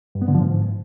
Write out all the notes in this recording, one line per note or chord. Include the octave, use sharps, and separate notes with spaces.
G2
B3
D3
F3
G#2